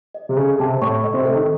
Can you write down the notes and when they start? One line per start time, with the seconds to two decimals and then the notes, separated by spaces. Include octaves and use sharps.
0.14 D#5
0.29 C3
0.37 C#3 A4
0.60 C3 A5
0.82 A2 C#6
1.04 D#5
1.14 C3
1.25 A4
1.35 D#3